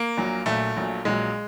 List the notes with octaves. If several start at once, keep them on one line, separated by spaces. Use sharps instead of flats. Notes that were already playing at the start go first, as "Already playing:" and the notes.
Already playing: A#3
A#1 A#2 F#3
A#1 A#2 F#3 A3
A#1 A#2 F#3
A#1 A#2 F#3 G#3